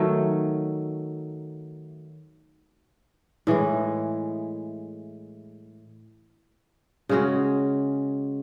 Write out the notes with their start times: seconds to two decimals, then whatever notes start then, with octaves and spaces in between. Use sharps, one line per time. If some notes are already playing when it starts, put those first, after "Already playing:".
Already playing: D#3 F#3 A3
3.47 A2 E3 G#3
7.09 C#3 G#3 C#4 F#4